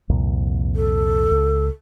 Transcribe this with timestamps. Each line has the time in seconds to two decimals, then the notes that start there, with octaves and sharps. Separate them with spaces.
0.10 C2 F2 A#2
0.76 A4
1.31 C#2